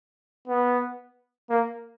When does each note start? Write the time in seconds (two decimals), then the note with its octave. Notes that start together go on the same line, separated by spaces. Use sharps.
0.48 B3
1.50 A#3